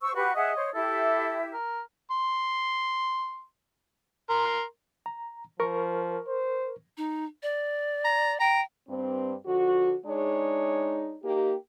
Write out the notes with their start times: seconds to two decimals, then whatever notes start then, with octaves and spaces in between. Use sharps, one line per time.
0.02 C5 C#6 E6
0.15 F#4 G4 B4 F#5
0.35 G#4 D#5 E5 F#5
0.55 C5 C#5
0.74 E4 G4 A4 E5
1.53 A#4
2.11 C6
4.30 A#4 C6
5.06 A#5
5.60 F3 A#4 C#6
6.27 C5
6.97 D#4
7.43 D5
8.05 A#5
8.40 G5 A#5
8.89 G2 C4
9.46 D3 F3 F#4
10.06 G#3 D4 D#4 G#4 C#5
11.23 A#3 D#4 G4